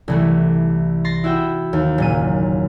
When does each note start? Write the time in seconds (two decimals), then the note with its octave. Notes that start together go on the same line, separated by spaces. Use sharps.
0.08 C2 E3 A3
1.05 C6 A6 A#6 C7
1.24 E4 F#4 E5 G5 B5
1.73 D#2
1.98 F#1 A#2 D#7